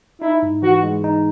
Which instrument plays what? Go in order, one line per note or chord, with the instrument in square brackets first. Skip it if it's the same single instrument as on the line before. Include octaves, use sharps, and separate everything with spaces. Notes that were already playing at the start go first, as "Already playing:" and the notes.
[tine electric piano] D#4 [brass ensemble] E4
[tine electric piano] G#2
[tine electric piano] E3 [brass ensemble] F#4
[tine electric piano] G#3
D#4